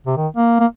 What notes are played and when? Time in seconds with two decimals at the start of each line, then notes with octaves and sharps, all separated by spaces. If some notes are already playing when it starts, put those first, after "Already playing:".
0.07 C3
0.17 D#3
0.37 A#3
0.60 A#3